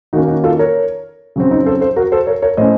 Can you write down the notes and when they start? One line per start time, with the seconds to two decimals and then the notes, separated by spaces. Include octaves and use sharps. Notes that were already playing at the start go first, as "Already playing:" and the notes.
0.13 D#3 A#3 C#4 D#4 F#4
0.28 D#4 F#4
0.44 F4 A4
0.59 A#4 C#5
1.36 C#3 F#3 C4
1.51 D#4
1.66 A4 C5
1.81 A4 C5
1.96 F#4 A#4
2.12 A4 C5
2.27 A#4 C#5
2.42 A#4 C#5
2.57 A2 A3 C#4 C5 D#5